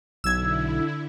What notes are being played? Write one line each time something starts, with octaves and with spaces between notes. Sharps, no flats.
B1 D3 E4 E6 G#6